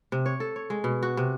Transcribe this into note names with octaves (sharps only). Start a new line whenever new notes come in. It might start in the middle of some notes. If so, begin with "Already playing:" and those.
C3
C#5
A4
C#5
G#3
B2
F#4
C3